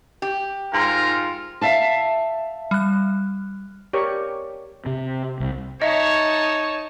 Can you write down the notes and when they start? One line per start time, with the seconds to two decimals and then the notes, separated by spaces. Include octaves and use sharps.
0.22 G4
0.73 G#2 F4 A#4
1.61 E5 F5 A5
2.71 G3 F#6
3.93 G4 A#4 C#5 D5 C#6
4.86 C3
5.40 C2
5.82 D#4 C#5 D#5 E5 A5